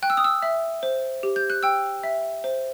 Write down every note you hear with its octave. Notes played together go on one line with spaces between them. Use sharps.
G5 F#6
E6
D#6
E6
E5
C5
G4
G6
F#6
G5 E6
E5
C5